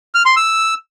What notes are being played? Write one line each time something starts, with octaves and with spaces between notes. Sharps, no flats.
F6
C6
E6